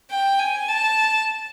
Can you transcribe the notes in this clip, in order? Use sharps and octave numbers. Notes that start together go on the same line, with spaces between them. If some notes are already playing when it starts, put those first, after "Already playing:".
G5
G#5
A5